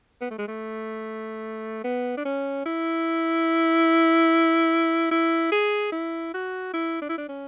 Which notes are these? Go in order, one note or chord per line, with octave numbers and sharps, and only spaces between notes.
B3
A3
G#3
A3
B3
D4
C#4
E4
E4
G#4
E4
F#4
E4
D4
E4
D4
C#4